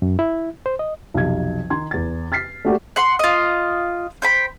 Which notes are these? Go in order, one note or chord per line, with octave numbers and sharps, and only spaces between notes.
F#2
E4
C5
D#5
B1 F2 C3 G#6
D#3 D#4 C6 G#6
E2 A6
F6 A6 B6 C7
A3 A#3 F#4 G4 A4 D5
F#5 C6
F4 D#5
C5 G5 B5